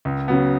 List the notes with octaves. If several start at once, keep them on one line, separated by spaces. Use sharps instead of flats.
C#2
C#3 F#3 B3